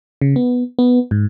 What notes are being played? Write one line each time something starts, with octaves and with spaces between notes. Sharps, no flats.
C#3
B3
B3
G#2